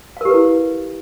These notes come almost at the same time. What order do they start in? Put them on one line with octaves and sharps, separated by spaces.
F5 A#4 G4 B4 E4